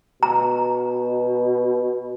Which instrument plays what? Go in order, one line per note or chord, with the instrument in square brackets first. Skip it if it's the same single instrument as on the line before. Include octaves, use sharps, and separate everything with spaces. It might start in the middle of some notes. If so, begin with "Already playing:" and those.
[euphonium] B2 [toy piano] A#5